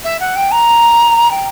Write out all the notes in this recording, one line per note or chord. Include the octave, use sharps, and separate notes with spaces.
E5
F#5
G5
A#5
G5